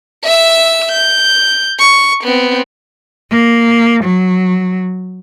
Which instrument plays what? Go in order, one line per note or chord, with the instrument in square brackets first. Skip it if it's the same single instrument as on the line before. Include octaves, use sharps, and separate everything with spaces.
[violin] E5 E6
G6
C#6
B3 C4
[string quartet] A#3
F#3